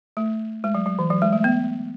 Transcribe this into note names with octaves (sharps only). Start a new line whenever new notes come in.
A3
G#3
F#3
F#3
E3
F#3
G#3
A3
B3